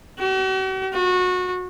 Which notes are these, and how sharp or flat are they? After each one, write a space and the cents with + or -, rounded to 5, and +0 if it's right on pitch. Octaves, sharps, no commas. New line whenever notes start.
F#4 +45
F#4 -25